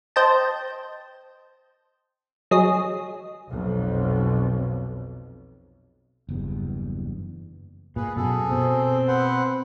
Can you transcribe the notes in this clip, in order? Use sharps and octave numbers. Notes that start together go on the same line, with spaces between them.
C5 D#5 G5 A5
F#3 G#4 D#5
B1 F2
F#1 E2 G2
A#2 G#4 B4
F#2 B2 G#4 A4
B2 C4
B4 C5 F#5